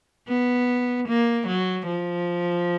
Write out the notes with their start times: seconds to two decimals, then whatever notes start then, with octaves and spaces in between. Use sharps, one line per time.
0.29 B3
1.08 A#3
1.47 F#3
1.87 F3